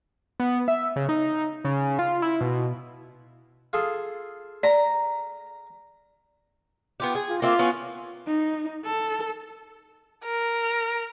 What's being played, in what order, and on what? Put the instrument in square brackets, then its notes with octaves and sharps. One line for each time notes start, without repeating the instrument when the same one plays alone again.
[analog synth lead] B3
E5
C#3
D#4
C#3
F4
E4
B2
[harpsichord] F4 G#4 A4
[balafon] D5 [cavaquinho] A#5
[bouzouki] B3 F4 G4
G#4
[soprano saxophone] F4
[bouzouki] A#3 C4 E5 [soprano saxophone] F4
[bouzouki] B3 C#4 E4
[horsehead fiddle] D#4
A4
[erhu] A#4